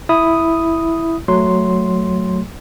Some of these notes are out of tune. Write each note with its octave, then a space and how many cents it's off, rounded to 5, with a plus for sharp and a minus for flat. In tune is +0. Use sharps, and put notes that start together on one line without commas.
E4 +0 D#6 +0
F#3 +0 A3 +0 C6 +0